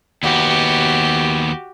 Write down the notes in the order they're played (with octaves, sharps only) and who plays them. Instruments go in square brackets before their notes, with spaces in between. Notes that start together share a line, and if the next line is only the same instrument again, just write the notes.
[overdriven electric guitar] D#2 B3 [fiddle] F#4 G4